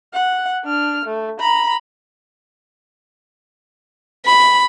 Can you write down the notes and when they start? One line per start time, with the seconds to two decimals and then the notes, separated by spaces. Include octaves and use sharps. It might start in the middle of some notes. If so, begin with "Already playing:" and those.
0.14 F#5
0.65 D4 F6
1.05 A3
1.40 A#5 B5
4.26 B5